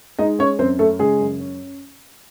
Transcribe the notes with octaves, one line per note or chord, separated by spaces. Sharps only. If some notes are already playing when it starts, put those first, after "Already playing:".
G#3 D#4 D#5
C#4 C#5
F#2 C4 C5
A3 C#4 A4
C#3 G#3 G#4
F#2
C#4